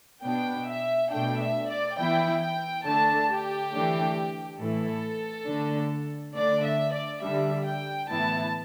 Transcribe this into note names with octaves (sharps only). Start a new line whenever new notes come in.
B2 B3 D4 G5
E5
B2 A3 D4 G5
E5
D5
E3 B3 E4 G5
G5
D3 A3 D4 A5
G4
E3 A3 D4
A2 E3 A3 E4 A4
D3 A3 D4
D3 A3 D4 D5
E5
D5
D3 G3 D4 E5
G5
A2 E3 B3 E4 A5